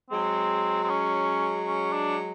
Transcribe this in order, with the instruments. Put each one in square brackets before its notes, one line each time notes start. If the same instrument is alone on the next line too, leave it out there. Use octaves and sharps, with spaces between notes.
[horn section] F#3 G#3 [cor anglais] C4
[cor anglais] C4
C#4
C#4
D4